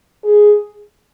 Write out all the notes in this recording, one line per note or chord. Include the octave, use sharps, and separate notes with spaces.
G#4